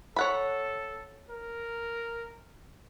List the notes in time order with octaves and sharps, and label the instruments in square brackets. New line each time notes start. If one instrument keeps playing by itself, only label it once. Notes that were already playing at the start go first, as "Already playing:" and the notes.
[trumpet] A4 [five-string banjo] C#5 F#5 B5
[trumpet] A#4